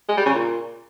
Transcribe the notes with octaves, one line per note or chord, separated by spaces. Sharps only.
G#3
G3
C#3
A#2